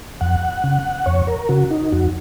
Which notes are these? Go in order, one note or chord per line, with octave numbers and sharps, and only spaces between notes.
F2 F#5
C#3
F2 C#5
A#4
C#3 F#4
D#4
F2 F#4